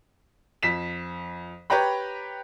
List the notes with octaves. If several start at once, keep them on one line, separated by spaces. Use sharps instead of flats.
F2 B6 E7
G4 B4 C#5 G5 A#5 B5